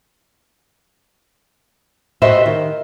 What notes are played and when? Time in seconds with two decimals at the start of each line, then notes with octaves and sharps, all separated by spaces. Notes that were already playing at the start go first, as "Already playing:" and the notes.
2.22 F#4 G4 B4 C5 D#5 E5
2.46 D#3